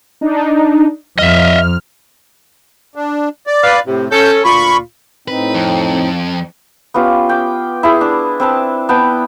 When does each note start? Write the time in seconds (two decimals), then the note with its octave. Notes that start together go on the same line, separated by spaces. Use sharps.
0.21 D4 D#4
1.19 F2 D#5 E5 F6
2.95 D4
3.47 D5
3.63 B4 F5
3.86 A2 C3
4.11 C#4 A4 G6
4.44 D2 A#2 F4 B5 C#6
5.28 A2 C4 D#4 B4
5.54 F2
6.94 B3 C#4 F4 G4
7.29 G5 D6
7.83 E4 G#4
8.01 D4
8.40 C4 B4 A5
8.89 B3 G5 A5